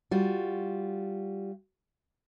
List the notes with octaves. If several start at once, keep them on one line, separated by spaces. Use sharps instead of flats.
G3 F4 F#4